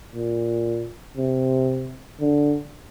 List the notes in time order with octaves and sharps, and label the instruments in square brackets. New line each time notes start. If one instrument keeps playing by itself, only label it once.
[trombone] A#2
C3
D3